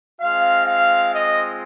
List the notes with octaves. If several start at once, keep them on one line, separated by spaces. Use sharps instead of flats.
G#3 C4 F4 F5
F5
D#5